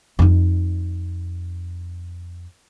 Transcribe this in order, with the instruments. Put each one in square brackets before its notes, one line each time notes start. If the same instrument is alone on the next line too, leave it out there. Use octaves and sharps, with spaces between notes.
[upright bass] F2 D#4